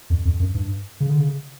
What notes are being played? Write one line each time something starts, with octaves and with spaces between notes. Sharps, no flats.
F2
F2
F#2
G2
C#3
D3
C#3